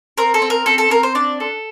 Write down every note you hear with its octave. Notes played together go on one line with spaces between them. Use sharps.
C4 A#4
A4
C4
A#4
C4 A4
A4
C4 A#4
C5
D4 D5
A4